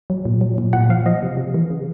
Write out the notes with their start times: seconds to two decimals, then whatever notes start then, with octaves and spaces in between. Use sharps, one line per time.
0.10 F#3
0.25 A#2
0.41 F#3
0.58 A#2
0.73 A#2 F#5
0.89 F3 F5
1.06 F3 D#5
1.22 C3
1.37 C3
1.54 E3
1.70 C#3